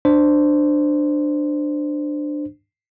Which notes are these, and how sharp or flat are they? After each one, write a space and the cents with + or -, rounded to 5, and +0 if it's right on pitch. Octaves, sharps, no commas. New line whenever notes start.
D4 +15 C5 -10